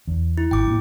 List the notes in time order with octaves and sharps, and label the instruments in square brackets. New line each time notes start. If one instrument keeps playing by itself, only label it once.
[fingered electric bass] E2
[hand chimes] E4
[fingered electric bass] G#1 [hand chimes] G5 D6
[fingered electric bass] G2 A#2